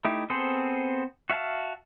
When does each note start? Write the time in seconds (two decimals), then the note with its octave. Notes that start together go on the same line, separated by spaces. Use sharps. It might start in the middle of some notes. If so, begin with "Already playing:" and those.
0.05 A3 D#4 E4 G4
0.30 B3 C4 G#4 A4 C5
1.30 F#4 E5 F5 G#5 A5